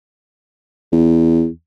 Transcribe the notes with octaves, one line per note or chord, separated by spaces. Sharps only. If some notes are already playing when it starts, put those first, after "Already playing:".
E2